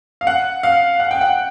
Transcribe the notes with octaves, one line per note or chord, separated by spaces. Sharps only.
F5
F#5
F5
F#5
G5
F#5